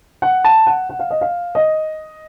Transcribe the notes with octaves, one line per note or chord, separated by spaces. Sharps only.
F#5
A5
F#5
F#5
F5
D#5
F5
D#5